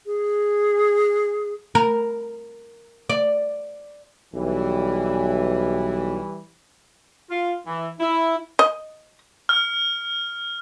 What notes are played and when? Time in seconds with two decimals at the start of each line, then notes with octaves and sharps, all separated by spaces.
0.06 G#4
1.75 A#4
3.09 D5
4.34 B1 E3 G3
7.31 F4
7.67 E3
8.00 E4
8.59 D#5
9.49 F6